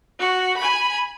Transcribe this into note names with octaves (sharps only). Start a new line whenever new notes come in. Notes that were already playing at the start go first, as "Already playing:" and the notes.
F#4
G#5 B5